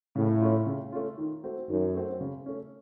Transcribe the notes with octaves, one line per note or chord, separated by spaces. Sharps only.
A2 C#3
A3 C#4 F4
C#3
A3 C#4 F4
D#3
A3 C4 F#4
F#2 D#3
A3 C4 F#4
C#3
A3 C#4